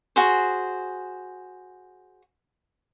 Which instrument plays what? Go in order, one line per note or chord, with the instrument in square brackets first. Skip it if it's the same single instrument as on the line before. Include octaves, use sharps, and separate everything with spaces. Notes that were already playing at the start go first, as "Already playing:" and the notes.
[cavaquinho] F#4 G#4 C5